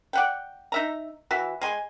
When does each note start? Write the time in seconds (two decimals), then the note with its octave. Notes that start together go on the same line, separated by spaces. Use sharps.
0.13 D5 F#5 G5
0.72 D#4 E5 A#5
1.31 E3 F#4 E5
1.61 G#3 G#5 C6